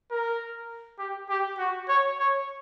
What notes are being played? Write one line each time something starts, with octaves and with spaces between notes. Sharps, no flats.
A#4
G4
G4
F#4
C#5
C#5